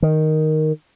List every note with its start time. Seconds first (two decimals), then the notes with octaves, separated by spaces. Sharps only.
0.02 D#3